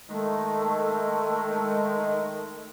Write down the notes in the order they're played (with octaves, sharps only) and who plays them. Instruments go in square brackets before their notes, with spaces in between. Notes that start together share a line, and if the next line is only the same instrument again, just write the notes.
[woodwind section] D#3 G#3 [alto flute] A3